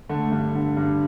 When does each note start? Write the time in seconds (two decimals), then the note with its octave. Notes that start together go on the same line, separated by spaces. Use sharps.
0.09 D3 A3
0.32 G2
0.55 D3
0.77 G2